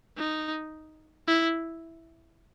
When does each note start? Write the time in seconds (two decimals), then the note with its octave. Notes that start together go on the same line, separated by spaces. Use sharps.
0.18 D#4
1.28 E4